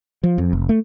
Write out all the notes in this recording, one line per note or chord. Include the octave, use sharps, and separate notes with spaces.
F3
F2
F1
A3